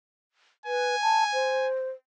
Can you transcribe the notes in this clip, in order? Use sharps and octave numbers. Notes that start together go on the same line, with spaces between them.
B4 G#5
A5
C5